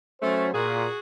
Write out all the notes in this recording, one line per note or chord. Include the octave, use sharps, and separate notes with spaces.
F#3 A3 C#4 C5
A#2 F#4 G#4